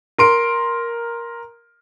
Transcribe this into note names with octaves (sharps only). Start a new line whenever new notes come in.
A#4 C6 D7